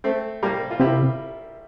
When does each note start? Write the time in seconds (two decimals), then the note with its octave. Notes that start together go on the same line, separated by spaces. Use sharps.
0.04 A3 C4
0.42 G3 A#3
0.71 F4
0.79 C3 E4 G4